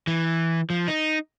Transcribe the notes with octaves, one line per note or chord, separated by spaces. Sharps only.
E3
F3
D#4